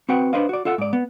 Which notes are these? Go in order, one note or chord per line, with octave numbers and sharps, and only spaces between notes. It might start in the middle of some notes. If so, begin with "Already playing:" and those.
C4 F#4 B4 F#5 G5
D4 B4 C5 D#5 F5
F#4 D5
F4 A4 E5 F#5
G#2 D5
B3